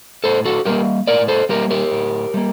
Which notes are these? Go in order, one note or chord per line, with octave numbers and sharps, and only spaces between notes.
A2 A4 C5
F#4 A4
G3 A#3 G4 A#4
A2 A#4 D5
A4 C5
G3 A#3 G4 A#4
G4 A#4
A2
G3 A#3